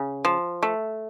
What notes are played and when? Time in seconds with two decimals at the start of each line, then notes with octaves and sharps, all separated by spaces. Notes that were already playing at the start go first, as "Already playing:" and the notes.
Already playing: C#3
0.25 F3
0.63 A3